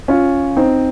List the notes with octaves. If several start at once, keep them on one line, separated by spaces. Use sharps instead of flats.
C#4 F4
C4 D#4